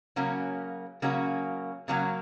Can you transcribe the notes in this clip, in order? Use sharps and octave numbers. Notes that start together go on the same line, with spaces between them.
C#3 F#3 A#3 C#4 F#4
C#3 F#3 A#3 C#4 F#4
C#3 F#3 A#3 C#4 F#4